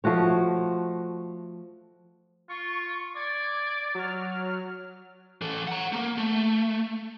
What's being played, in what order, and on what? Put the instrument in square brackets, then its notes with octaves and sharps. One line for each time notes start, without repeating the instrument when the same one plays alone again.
[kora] F3 A3 F#4 C#5
[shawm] F4 [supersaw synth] C#6
[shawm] D5 [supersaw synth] G#6
[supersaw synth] F#3 F6
[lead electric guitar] E3 A4
F#5 A#5
A3 A#3
A3